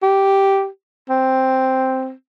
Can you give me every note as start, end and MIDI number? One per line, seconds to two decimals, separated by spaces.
0.03 0.67 67
1.09 2.12 60